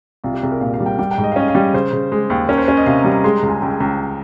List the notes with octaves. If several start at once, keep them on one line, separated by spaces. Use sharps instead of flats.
C2 F4
G4
C2 G#4
A#4
A#2 F5
F5
G3
G5
G3 G5
G5
G#2
D#5
F5
C#4 D#5
F5
G3 D#5
C#3 C5
C#3
G#3
D#2
C#4 A#4
C5
C#4 C#5
D#5
C3 F5
A#5
G3
A#5
G#3 C6
A#5
C#2
G#5
C#2 G5
G#5
C#2 A#5